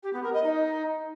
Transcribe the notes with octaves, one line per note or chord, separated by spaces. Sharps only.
G4
B3
A#4
D#5
D#4